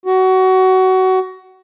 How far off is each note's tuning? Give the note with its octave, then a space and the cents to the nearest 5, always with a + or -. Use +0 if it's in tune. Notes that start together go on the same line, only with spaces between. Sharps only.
F#4 +20